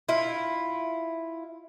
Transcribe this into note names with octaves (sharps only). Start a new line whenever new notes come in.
E4 F4